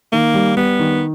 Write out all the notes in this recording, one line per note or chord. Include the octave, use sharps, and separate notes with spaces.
D#3 A#3
G3
G3 B3
D#3